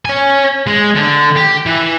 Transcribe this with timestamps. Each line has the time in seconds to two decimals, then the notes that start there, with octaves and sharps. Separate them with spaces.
0.05 C#5 G#5
0.67 G#3
0.96 D3
1.36 G4
1.66 E3